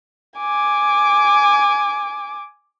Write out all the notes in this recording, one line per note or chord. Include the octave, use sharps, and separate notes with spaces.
G#5 D6